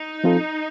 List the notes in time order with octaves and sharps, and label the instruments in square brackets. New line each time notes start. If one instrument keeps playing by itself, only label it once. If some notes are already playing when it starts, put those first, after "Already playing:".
Already playing: [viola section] D#4
[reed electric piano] F3 C4 F4 A4